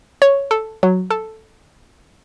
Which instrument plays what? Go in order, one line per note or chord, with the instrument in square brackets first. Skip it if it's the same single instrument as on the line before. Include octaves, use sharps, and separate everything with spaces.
[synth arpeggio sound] C#5
A4
F#3
A4